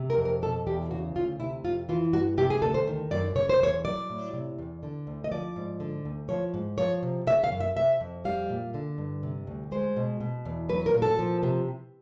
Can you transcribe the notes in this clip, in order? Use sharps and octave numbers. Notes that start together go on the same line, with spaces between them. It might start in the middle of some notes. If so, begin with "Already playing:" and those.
Already playing: C3
A#4
F2
A#4
B2 A4
E2 G4
C#3 F#4
D2 F4
C3 E4
F2 F4
E3 F4
G2 F#4
C3 G4
G#4
D2 A4
C5
D#3
F#2 D5
C#3 C#5
C5
E2 C#5
F#3 D5
A2
C3
E2
D3
D2
D#5
F3 D5
G#2
D3
D2
F3 C#5
G#2
F3 C#5
C3
C#3 E5
F5
F#2
E5
C3 E5
F2
G3 F5
A#2
D3
G2
C3
D2
G#3 C5
B2
B2
E2
F#3 B4
A#4
A#2
A4
F3
C3